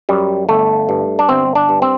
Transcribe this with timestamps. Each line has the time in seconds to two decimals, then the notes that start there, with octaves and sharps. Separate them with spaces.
0.09 F#2 G3
0.49 G1 A3
0.89 G2
1.19 D4
1.29 G1 C4
1.55 D4
1.69 G2
1.82 C4